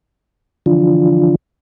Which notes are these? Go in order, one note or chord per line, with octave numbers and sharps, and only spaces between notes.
D3 E3 F3 D4 F4